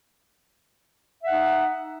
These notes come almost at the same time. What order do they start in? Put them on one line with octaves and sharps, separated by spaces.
E5 F#5 D#4